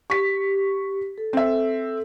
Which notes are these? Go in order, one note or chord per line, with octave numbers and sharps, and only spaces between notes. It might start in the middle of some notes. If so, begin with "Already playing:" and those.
G4 C#6 B6
A4
C4 E5